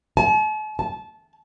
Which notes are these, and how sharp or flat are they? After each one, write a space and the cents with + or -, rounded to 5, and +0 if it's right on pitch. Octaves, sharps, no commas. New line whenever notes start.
A5 -45
A5 -20